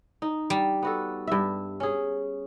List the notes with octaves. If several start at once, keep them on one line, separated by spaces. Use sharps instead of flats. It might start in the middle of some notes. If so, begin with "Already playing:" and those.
D#4
G3
B3 F#4 A4
G2 E5
C#4 G#4